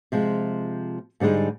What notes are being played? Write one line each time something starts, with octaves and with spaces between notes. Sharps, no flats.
C3 F3 G#3
G#2 D3 G3 G#3 D#4